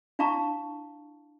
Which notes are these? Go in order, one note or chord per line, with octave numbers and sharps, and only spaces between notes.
D4 E4 F5 A5 A#5 C#6